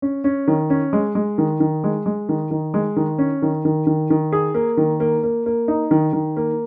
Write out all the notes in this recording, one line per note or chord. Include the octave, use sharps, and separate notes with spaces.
C#4
C#4
D#3
C#4
G#3
G#3
D#3
D#3
G#3
G#3
D#3
D#3
G#3
D#3
C#4
D#3
D#3
D#3
D#3
G#4
A#3
D#3
A#3
A#3
A#3
D#4
D#3
D#3
A#3